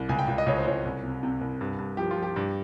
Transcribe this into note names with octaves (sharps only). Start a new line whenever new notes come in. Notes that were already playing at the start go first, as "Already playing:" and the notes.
Already playing: C2
C#2 G#5
G5
C#2
D#5
C#2 C#5
C5
C#2 C#5
C2
C3
C3
C2
G2
G2
F3 G4
F4
F3
G4
G2